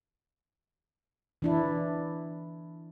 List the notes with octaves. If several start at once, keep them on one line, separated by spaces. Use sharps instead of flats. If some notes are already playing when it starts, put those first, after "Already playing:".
E3 D4 E4